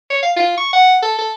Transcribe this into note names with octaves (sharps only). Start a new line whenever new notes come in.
C#5
F5
F4
C#6
F#5
A4
A4